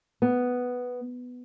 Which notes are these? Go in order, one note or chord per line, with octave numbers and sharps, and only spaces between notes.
B3